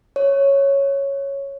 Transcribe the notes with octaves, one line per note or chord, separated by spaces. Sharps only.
C#5